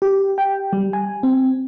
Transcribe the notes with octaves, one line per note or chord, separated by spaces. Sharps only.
G4
G5
G3
G#5
C4